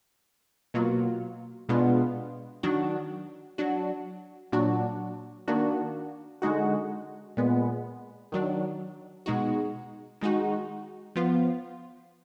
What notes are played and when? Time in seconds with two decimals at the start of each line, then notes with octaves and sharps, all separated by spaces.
0.74 B2 F#3 A#3 F4
1.69 B2 G#3 B3 D4 F4
2.63 D#3 F#3 D4 F#4
3.58 F#3 D4 F#4
4.52 A#2 F#3 D4 F#4
5.48 D#3 A#3 D4 F#4
6.42 D3 G#3 D#4 F#4
7.37 A#2 G#3 B3
8.32 D#3 F#3 D4
9.26 B2 G#3 D#4 F#4
10.21 D#3 G#3 D#4 F#4
11.16 F3 B3 F4